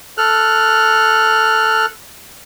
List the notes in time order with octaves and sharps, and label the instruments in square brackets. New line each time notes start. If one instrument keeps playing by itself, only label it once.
[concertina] A4 F6 F#6